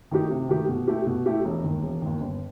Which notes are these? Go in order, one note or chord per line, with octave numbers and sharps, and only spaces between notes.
D#3 A3 D#4 G4
C3
D#3 A3 D#4 G4
B2
A3 E4 G4
B2
A3 E4 G4
E1
D#2 D#3
E1
D#2 D#3
G1